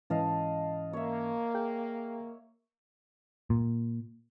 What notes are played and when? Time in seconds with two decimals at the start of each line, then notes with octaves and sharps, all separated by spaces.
0.10 G#2 E3 C#4 D#5 F5 A5
0.93 A#3 C#5 E5
1.55 G#4 G5
3.50 A#2